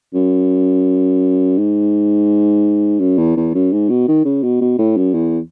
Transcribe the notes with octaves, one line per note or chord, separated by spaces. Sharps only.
F#2
G#2
F#2
E2
E2
F#2
G#2
B2
D#3
C#3
B2
B2
A2
F#2
E2